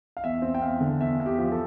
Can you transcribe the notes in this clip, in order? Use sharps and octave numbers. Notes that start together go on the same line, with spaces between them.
F5
E2 E5
C4
G5
E2 F5
D3
E2 E5
E2
G4
F3
A4